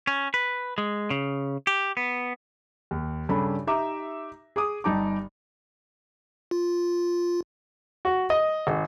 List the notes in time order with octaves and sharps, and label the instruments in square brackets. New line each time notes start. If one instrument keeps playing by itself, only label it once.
[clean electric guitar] C#4
B4
G#3
C#3
G4
B3
[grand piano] D#2
G2 C#3 D4 A4 B5
D#4 G4 E5 A#5 D6
G#4 D6 D#6
G1 G2 D#4 A5 D6
[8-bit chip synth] F4
[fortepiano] F#4
D#5
G#1